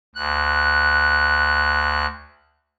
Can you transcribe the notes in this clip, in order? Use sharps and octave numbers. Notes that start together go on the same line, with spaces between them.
D2 F#6